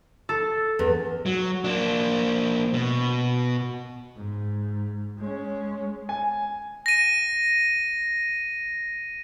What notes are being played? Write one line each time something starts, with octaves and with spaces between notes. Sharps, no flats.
A4
E2
F#3
A#3 D4
B2
G#2
G#3 C#4
G#5
A#6 D#7